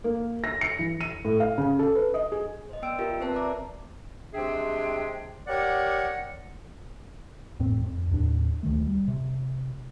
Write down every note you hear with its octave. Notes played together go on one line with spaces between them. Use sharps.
A#3
A#6
C#7
E3
D#7
A2
F5
C#3
A4
B4
D#5
G#4
C5 D#5
B3 D5 G5 E6 D7
F4 G4 A#4 E5
C4 B4 C5 A5
D5 E5 A#5 D6
C3 G#3 D4 G#4 E5 G5
G4 A#4 C#5 D5 F#5
E2 A2 C4
F2
D#2 A2 D4
D2 D#3 A3
G3
C3